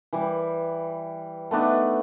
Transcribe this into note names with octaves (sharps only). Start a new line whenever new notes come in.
E3 G3
A3 B3 D4 D#4